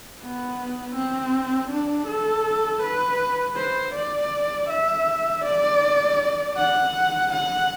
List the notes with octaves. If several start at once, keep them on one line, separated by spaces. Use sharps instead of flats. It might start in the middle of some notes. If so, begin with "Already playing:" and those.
B3
C4
D4
A4
B4
C5
D5
E5
D5
F#5
F#5